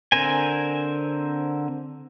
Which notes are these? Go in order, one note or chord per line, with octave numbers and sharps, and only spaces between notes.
D3 C4 A#4 C5 G#5